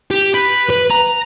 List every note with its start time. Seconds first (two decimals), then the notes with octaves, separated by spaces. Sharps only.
0.11 G4
0.35 B4
0.70 B4
0.91 A#5